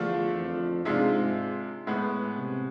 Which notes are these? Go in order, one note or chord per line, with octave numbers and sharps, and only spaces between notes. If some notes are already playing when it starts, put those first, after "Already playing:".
Already playing: E2 D3 F3 A3 D4 F4
F2
G#2 C3 G#3 D4 F4
A2 G#3 B3
C3